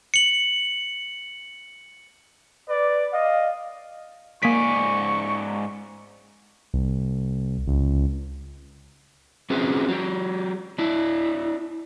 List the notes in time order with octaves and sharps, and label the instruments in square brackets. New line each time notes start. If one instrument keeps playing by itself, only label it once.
[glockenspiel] C#7 F#7
[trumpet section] B4 D5
D#5 F5
[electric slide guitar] G#2 D5 G#5 [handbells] A#3 B6 [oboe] C#6
[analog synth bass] C2
C#2
[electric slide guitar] C4 C#4 F#4 G#4 B4 C5
F#3 G4
D4 E4